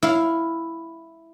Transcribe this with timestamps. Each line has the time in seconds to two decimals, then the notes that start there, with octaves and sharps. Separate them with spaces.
0.03 E4 F5